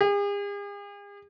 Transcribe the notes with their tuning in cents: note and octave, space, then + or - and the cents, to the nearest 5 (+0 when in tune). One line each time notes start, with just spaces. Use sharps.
G#4 -45